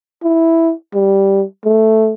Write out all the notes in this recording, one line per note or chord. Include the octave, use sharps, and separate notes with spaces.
E4
G3
A3